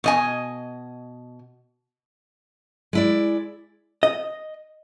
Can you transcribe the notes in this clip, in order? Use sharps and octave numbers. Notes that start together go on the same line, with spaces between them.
B2 D#5 G#5
G#3 E4 D5
D#5